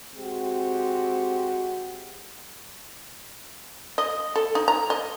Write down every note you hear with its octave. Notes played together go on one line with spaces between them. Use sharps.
G#3 C4 F#4 G4
D#5
A4
D#4
A#5
D#5